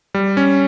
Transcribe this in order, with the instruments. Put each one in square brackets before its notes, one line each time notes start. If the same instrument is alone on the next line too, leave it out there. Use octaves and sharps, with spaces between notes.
[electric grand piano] G3
C#4